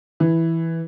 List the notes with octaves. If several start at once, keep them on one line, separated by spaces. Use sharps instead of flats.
E3